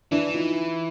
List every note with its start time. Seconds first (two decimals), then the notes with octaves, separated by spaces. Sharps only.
0.12 E3 D4 E4
0.34 D#4 F4